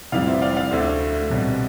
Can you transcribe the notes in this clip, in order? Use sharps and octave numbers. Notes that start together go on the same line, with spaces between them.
F1 F2 E3 G3 D5 F5
C5 E5
D5 F5
D5 F5
D2 D3 A3 C5 E5
C2 B2 G3